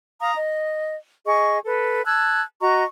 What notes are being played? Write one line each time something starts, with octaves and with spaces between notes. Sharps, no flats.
F5 A#5 D#6
D#5
G#4 D#5 C#6
A4 B4
A5 E6 F#6 G#6
F#4 D#5 A#5 C#6